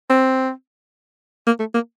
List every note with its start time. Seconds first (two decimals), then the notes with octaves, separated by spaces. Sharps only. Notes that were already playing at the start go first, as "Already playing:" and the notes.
0.10 C4
1.47 A#3
1.59 A3
1.74 A#3